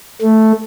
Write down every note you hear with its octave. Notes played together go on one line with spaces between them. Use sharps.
A3